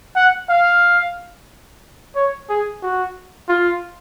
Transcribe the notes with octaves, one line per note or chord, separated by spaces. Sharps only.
F#5
F5
C#5
G#4
F#4
F4